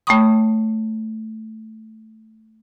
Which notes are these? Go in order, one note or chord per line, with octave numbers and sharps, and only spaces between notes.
A3 C#5 G5 B5 C#6 D#6